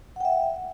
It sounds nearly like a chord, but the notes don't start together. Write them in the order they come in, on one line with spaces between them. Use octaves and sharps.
F#5 G5 E5